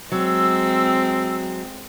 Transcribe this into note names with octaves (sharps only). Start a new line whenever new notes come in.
F#3 G#3 C4 E6